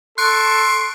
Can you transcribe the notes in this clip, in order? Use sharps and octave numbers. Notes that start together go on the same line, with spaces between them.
A4 C6 C#6 F#6 D7